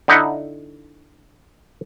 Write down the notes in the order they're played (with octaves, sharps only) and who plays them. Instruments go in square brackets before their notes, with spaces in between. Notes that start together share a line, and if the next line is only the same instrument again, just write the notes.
[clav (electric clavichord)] D3 D#4 E4 F#5